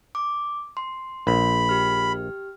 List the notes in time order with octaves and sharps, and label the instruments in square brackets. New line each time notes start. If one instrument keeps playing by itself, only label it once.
[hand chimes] D6
C6
[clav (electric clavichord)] A#1 [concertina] B5
[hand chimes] G4 F6